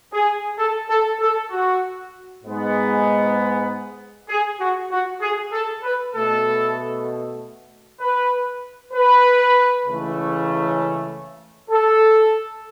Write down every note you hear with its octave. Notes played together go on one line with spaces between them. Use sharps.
G#4
A4
A4
A4
F#4
G#2 G#3 B3
G#4
F#4
F#4
G#4
A4
B4
B2 A3 A4
B4
B4
C#2 C#3 E3 A3
A4